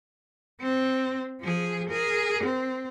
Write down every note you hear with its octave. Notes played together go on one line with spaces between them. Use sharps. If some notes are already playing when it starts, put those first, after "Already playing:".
C4
F3 G#4
G#4 A#4
C4